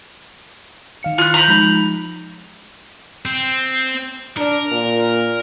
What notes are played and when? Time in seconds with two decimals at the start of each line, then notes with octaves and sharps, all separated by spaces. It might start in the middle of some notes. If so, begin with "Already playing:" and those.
1.03 D#3 F5 C#7
1.18 F4 F#6
1.34 A#5 B5 G6
1.48 F3 G#3 D#4
3.25 C4
4.37 D4 A#4
4.71 A#2